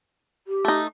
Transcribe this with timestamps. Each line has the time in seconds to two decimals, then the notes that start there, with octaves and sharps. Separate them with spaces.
0.47 G4
0.65 A3 D#4